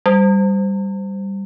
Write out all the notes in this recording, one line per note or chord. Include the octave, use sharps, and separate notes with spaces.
G3